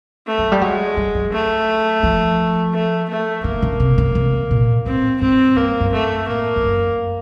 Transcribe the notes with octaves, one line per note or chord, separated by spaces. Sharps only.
A3
F#3
G3
F#3 G#3
G3
F#3
A3
F3
A3
A3
D3 A#3
C#3
C3
C#3
C3
A#2
A2 C4
G#2 C4
G2 A#3
F#2
A3
A2 A#3
F2
F#2